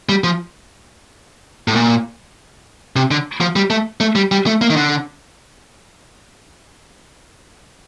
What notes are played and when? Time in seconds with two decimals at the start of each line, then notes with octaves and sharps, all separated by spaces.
0.09 G3
0.24 F3
1.68 A2
1.76 A#2
2.96 C3
3.11 D3
3.41 F3
3.56 G3
3.70 A3
4.00 A3
4.15 G3
4.32 G3
4.46 A3
4.61 A#3
4.70 D#3
4.76 D3